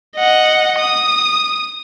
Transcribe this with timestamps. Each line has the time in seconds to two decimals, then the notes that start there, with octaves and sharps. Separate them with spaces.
0.16 D#5 F#5
0.79 D#6